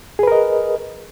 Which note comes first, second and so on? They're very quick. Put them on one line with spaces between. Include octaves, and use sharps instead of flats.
G#4 B4 A#4 D#5